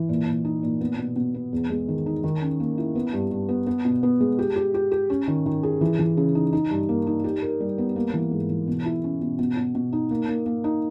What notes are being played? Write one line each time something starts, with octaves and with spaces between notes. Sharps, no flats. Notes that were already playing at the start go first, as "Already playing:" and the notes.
Already playing: E3
A#2
A#2
D#4
A#2
B3
B2
B2
B3
E2
G#3
D#3
D#4
D#3
C#4
A#3
E4
B3
G2
G2
B3
B3
B2
B3
G#3
G4
G4
G4
G4
C#4
D#3
D#3
G#4
E3
E3
C#3
D#4
D#4
G2
A#3
D#4
G4
A#4
G3
B3
A#3
E3
G#2
E3
B2
E4
C#4
B2
B2
B2
B2
D#4
A#3
A#3
A#3
D#4